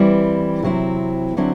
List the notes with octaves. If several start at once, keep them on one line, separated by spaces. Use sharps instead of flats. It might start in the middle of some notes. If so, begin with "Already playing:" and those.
Already playing: E3 G3 C4 E4
C3 F#3 C4 E4
D3 F#3 C4 E4